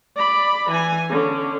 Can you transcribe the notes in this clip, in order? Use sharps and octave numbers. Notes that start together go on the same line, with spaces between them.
D5 B5
E3 G#5
D3 C#4